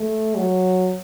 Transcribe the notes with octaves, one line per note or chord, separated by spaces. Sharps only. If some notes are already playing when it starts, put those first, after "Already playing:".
Already playing: A3
F#3